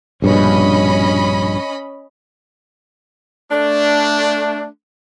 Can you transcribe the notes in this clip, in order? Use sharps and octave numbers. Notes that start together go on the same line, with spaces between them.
A#1 G2 B2 C#4 D#5 B5
A3 D4